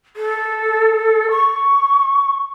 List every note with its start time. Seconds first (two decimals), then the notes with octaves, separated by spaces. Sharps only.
0.16 A4
1.31 C#6